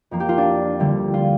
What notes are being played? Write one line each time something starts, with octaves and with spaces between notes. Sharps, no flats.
F2 F3 A#3
G4
F4
D4
D2 D3 G3
F4